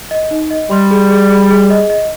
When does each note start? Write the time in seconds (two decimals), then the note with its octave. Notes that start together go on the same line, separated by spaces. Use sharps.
0.11 D#5
0.31 D#4
0.50 D#5
0.70 G3 C6
0.91 G#4
1.10 G#4
1.30 G#4
1.50 G#4
1.70 D#5
1.90 D#5